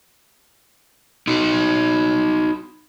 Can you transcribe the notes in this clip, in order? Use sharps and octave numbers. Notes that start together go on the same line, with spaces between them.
D#4 F#4